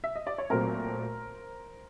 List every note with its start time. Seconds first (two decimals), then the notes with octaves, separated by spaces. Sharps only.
0.04 E5
0.16 D#5
0.27 D5
0.38 C#5
0.50 A#2 F#3 A3 C4 A#4 C5